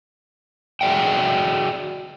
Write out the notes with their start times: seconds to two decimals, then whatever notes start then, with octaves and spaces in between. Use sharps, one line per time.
0.81 F#4 G#4 D5 E5 G5